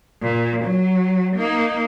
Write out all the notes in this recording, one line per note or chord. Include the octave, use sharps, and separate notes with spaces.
A#2
F#3
A#3 D#4